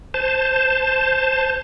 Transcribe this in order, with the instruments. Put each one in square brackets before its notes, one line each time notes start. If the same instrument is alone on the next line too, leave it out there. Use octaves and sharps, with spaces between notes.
[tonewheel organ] C5 A5